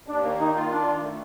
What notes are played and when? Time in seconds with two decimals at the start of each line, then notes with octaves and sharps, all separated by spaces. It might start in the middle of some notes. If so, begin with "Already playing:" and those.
0.08 D#2 D4
0.23 A#3
0.39 D#3 D#4
0.55 F4
0.71 D#3 D4
0.86 D#3
1.02 A3